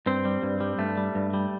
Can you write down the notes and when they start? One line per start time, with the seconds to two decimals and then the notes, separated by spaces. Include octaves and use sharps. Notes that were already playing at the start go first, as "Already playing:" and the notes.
0.06 G2 C4
0.25 G3
0.43 G2
0.60 G3
0.78 G2 A3
0.97 G3
1.15 G2
1.33 G3